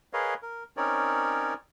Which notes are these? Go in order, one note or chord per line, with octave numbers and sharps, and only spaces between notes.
G#4 A#4 B4 C#5 D#5 F5
A#4
C4 C#4 D#4 A#4 C#5 D5